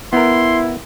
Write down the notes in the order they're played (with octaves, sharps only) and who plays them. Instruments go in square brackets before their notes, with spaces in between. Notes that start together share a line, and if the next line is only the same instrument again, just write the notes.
[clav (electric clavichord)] B3 A#4 [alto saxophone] E4 [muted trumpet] C6